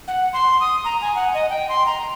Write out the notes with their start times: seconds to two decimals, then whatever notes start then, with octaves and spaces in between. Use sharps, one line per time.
0.08 F#5
0.33 C6
0.61 D#6
0.85 A#5
1.01 G#5
1.15 F#5
1.34 D#5
1.50 G5
1.69 C6
1.86 A#5